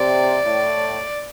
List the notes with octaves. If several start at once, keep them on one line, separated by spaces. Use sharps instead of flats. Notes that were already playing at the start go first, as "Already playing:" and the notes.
Already playing: C3 D5
A2